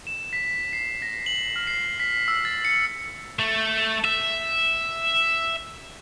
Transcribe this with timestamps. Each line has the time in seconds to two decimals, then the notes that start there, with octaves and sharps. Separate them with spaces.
0.07 E7
0.33 B6
0.73 C7
1.02 A#6
1.26 F#7
1.56 F6
1.67 C7
2.00 B6
2.28 E6
2.45 A6
2.65 C#7
3.39 A3
4.05 E5